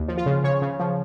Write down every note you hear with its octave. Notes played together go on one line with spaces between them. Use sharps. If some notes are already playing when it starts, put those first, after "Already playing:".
Already playing: D#2
F3
F4
C#3
C#3 C#5
C#3
F3